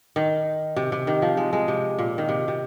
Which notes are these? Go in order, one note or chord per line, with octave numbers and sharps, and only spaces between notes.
D#3
C3
C3
D#3
F3
G#3
G#3
C3
A#2
D#3
C3
C3